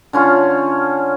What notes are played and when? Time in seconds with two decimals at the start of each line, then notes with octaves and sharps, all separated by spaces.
0.13 D3 C#4 F4